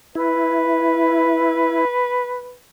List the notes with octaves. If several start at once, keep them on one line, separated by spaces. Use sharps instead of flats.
E4 B4